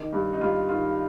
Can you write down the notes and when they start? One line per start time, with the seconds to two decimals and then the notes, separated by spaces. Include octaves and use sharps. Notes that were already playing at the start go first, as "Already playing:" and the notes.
Already playing: D#3 D#4
0.13 G2
0.33 D#4
0.41 G2 F4
0.69 D#3 F4